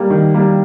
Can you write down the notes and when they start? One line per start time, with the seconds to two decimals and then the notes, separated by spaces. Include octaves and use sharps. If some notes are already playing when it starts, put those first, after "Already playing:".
Already playing: G3 A#3
0.10 D#3
0.34 G3 A#3